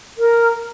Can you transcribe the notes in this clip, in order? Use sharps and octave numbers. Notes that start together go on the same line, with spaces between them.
A#4